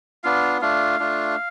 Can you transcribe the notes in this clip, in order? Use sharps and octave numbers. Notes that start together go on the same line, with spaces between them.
B3 D4 F4 F5
A3 D4 F4 F5
A3 D4 F4